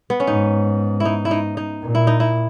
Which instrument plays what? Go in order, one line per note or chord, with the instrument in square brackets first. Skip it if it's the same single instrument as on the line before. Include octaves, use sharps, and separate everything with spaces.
[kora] B3
C#4
[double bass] G#2 [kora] D#4
[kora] E4
D#4
E4
D#4
D#4
[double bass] A#2
[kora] E4
D#4
E4